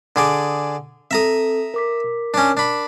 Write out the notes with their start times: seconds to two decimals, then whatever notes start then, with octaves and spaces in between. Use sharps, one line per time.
0.16 D3 G#4 D5
1.11 C4 A4 E5 A#5 D#6
1.74 A#4 D6 B6
2.34 C#4 D4
2.57 D4 B5